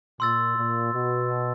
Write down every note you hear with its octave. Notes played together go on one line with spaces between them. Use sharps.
A#2 C6 E6 A6
A#2
B2